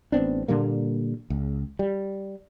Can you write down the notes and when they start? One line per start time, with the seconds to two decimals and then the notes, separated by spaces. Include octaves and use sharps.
0.12 A1 B3 C4 D4
0.48 A#2 D3 G3 A#3
1.30 C#2
1.79 G3